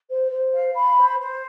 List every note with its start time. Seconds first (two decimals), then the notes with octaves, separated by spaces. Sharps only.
0.09 C5
0.31 C5
0.53 F5
0.74 B5
0.96 C5
1.18 C5